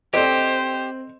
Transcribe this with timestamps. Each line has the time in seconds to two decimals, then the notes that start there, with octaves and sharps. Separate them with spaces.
0.14 C4 G4 A4 C5 D5 D#5